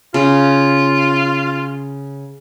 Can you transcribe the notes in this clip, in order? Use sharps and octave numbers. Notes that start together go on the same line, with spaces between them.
C#3 F4